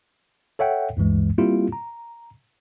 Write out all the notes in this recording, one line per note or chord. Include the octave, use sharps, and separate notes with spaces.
A4 C#5 E5 F#5 G5
D2 G2 E3 G#3
G3 A#3 C4 E4 F4 G4
A#5